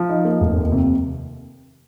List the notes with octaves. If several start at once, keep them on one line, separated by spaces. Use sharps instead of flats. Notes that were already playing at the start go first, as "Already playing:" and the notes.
Already playing: F3
D#4
A#3
F1
D#2
C3